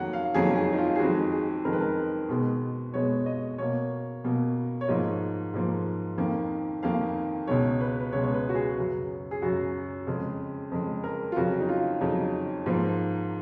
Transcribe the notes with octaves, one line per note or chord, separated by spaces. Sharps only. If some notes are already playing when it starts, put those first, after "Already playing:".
Already playing: F2 D#3 F#3 A#3 F#5
F5
F2 D#3 F#3 A#3 G#4
G#4
D#4
F4
G#4
F2 D#3 G#3 F#4
G#4
F2 D#3 G#3 A#4
B4
A#4
B2 G#3 B3
B2 G#3 B3 C#5
D#5
B2 A#3 C#5
B2 A#3
C#5
G#2 F3 A#3 D#5
G#2 F3 A#3
F2 D#3 A#3
F2 D#3 A#3 F5
C#2 B2 G#3 C#5
B4
B4
C#2 B2 G#3 C#5
C#5
B4
F#4
G#4
F#2 C#3 F#3
G#4
F#2 C#3 F#3 F#4
F2 C#3 G#3
F2 C#3 G#3
A#4
F4
F2 C#3 F#3 F#4
D#4
F4
F2 C#3 F#3 D#4
G#2 F3 A#3